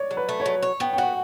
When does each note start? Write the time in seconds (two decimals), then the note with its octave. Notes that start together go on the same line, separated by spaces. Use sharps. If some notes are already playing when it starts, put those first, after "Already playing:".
Already playing: C#5 D5
0.11 F#3
0.17 B4
0.29 A3
0.40 C#5
0.46 F#3
0.62 C#5
0.80 B3 G5
0.93 G5
0.98 F#4 F#5